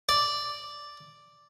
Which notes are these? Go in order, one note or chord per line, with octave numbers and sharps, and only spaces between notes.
D5